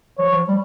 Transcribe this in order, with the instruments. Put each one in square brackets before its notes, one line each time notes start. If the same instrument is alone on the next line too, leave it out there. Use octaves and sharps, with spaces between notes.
[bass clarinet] F3 [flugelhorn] C#5
[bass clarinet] F3
G3